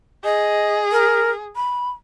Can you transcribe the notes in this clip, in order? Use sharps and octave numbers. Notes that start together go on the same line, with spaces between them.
G#4 D#5
A#4
B5